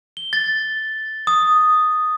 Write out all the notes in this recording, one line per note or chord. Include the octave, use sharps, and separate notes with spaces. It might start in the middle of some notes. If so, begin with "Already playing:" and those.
G7
A6
D#6